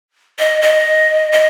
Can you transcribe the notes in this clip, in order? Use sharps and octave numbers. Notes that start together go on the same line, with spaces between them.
D#5
D#5
D#5